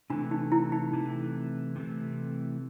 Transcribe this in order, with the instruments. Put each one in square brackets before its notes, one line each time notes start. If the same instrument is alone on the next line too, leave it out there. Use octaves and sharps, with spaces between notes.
[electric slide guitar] C3 E3 A3 [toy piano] D4
[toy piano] D#4
E4
D#4
[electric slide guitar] C3 E3 A3
C3 E3 A3